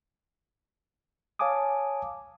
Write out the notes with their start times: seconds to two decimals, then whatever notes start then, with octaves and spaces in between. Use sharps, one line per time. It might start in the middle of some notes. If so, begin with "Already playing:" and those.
1.39 C#5 F5 G#5 A5 D6 D#6